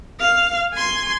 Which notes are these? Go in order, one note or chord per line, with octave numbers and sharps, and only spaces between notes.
F5
G#5 C6